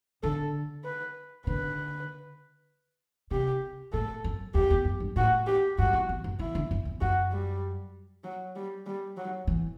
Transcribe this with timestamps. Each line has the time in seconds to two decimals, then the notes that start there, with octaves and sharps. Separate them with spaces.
0.23 D3 A4
0.84 B4
1.47 D3 B4
3.31 C3 G4
3.92 A2 A4
4.24 F#2
4.54 E2 G4
4.70 E2
4.85 F#2
5.00 G2
5.16 A2 F#4
5.47 G4
5.78 G2 F#4
5.93 F#2
6.09 E2
6.24 F#2
6.39 E3 E4
6.55 D3
6.71 F#2
6.85 E2
7.01 F#2 F#4
7.32 G3
8.24 F#3
8.56 G3
8.86 G3
9.17 F#3
9.47 E3